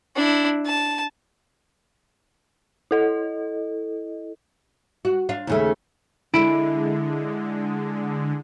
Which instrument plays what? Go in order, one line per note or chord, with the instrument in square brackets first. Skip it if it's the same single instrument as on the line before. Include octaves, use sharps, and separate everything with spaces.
[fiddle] D4 E4
A5
[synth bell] E4 A4 D#5
[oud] F#4
D4 F4
D#2 C#3 A3
[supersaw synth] D3 G#3 [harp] E4 D7